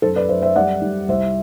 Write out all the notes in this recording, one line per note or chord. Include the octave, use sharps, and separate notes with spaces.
F#2 A4 C5
B4 D5
F#2 C5 E5
C5 E5
G3 D5 F#5
G3
C2 C5 E5